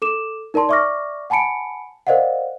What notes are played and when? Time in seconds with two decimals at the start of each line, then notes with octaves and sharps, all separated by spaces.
0.02 A4 D6 E7
0.54 D#4 A#4 D5 A5 C6
0.69 D5 E5 C#6 D6 F6 A#6
1.30 F#5 G#5 A5 B5 C#7 D7
2.07 A#4 C5 D5 D#5 F5 F#5